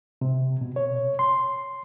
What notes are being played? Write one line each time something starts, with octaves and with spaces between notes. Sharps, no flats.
C3
B2
C#5
C6